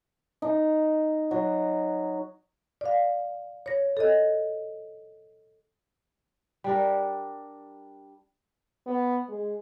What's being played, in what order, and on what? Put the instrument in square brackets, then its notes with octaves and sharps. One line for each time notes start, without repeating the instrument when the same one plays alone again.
[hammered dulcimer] D#4
F#3
[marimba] D5 F5
C#5 A#6
A4 D#5
[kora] G3 D4 A#4
[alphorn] B3
G#3